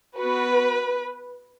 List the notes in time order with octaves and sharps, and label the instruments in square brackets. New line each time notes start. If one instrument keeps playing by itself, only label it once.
[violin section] B3 F#4 B4